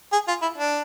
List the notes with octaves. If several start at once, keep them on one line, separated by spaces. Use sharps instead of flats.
G#4
F4
E4
D4